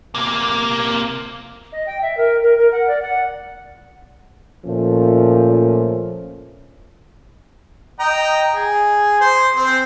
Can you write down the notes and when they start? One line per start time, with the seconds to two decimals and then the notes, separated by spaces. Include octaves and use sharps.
0.15 C3 A#3
1.72 D#5
1.87 G5
2.02 E5
2.17 A#4
2.43 A#4
2.58 A#4
2.72 F#5
2.88 D5
3.02 F#5
4.65 A#2 F3 A3 C#4
8.00 D#5 G5 A#5
8.54 G#4
9.21 C5 C6
9.56 C4 C5